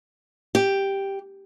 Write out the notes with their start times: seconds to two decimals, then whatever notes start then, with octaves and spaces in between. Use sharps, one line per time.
0.55 G4